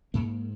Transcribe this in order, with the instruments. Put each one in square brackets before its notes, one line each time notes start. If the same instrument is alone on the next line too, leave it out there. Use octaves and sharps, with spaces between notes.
[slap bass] G#2 A#3